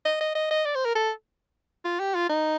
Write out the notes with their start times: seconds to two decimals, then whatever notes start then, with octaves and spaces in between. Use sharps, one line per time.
0.05 D#5
0.21 D#5
0.35 D#5
0.51 D#5
0.65 D5
0.75 C5
0.85 A#4
0.95 A4
1.85 F4
2.00 G4
2.15 F4
2.29 D#4